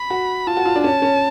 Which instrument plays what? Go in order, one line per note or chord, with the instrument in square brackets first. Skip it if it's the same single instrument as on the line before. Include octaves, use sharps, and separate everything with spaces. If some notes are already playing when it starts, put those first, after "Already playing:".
Already playing: [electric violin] B5
[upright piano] F#4
[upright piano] F4 [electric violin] A5
[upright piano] F#4
F4
D4
[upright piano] C#4 [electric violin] A5
[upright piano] C#4